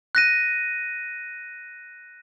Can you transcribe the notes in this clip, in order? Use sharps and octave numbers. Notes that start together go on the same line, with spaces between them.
F#6 A#6 D#7